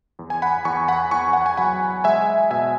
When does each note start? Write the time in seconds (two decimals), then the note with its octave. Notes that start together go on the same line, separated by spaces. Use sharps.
0.19 E2
0.30 G#5
0.42 F#5 B5
0.65 E2 G#5 C#6
0.88 F#5 B5
1.11 E2 G#5 C#6
1.33 F#5
1.46 G#5
1.57 F#3 F#5 B5
2.04 G#3 E5 G#5
2.51 B2 E5 G#5